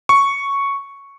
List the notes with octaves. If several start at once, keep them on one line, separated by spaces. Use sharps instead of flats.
C#6